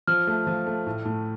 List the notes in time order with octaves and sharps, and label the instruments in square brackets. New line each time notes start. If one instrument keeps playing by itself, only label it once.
[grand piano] F3 [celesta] F6
[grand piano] A3
F3
A3
A2
A2